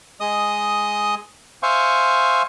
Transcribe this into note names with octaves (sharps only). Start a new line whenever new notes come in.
G#3 D#5 D#6
C5 E5 F5 G#5 C#6